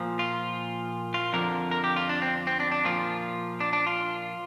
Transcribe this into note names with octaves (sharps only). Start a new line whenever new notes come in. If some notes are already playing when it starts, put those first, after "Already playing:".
Already playing: A#2 F3
F4
F4
F2 D3 F3 A#4
A#4
G4
F4
D4
C4
C4
D4
D4
A#2 F3 F4
D4
D4
F4